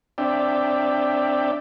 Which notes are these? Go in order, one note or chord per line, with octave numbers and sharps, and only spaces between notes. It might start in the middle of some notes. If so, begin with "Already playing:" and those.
C4 D4 D5 E5 G5